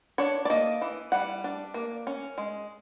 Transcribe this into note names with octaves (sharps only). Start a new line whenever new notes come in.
D4 C#5
D5
A#3 D#5
E3
G3 F#5
D4
A#3
C#4
G#3